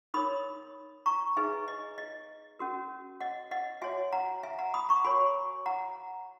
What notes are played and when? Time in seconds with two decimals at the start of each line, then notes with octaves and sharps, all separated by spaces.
0.14 D#4 A#4 C#5 B5 D#6
1.06 A#5 C#6
1.37 D#4 G#4 B4 E5 G#5
1.68 D#5
1.98 D#5
2.59 C#4 F#4 A#4
3.20 D#5 F#5
3.51 D#5 F#5
3.82 F#4 C#5 E5 G#5
4.13 F#5 A#5
4.43 E5 G#5
4.59 F#5 A#5
4.74 B5 D#6
4.89 A#5 C#6
5.04 F#4 A#4 C#5 G#5 B5
5.66 F#5 A#5